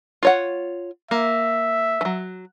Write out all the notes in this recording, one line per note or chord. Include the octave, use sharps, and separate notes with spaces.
F4 C#5 F#5
A#3 E5
E3 F#3